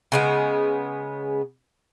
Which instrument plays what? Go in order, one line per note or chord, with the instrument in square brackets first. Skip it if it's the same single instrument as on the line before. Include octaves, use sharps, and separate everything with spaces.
[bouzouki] C#3 G#3 B3